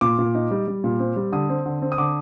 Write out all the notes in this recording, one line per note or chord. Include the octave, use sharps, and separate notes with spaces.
A#2 D6
A#2
D#4
G3
G3
A#2
C4
G3
D3 D#6
C4
D3
C4
D#6
D3 D6